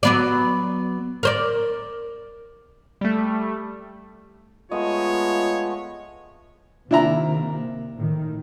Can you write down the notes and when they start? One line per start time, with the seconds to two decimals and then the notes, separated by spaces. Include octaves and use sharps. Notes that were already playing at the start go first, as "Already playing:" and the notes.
0.03 F#3 B3 D5
1.23 A#4 C5 D5
3.01 G3 A3
4.71 G#3 A3 B3 F4 C#5 D#5
6.91 C3 D#3 A#3 D4 E4 A#5
7.98 A2 D#3